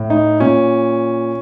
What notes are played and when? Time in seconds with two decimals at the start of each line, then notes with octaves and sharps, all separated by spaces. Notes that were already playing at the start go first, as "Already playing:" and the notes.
Already playing: A2
0.10 D#4
0.40 A#2 C#4